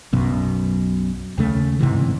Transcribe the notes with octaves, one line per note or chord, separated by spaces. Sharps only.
B1 F#2 B2
D#2 C#3 A3
G1 G#2 C3 E3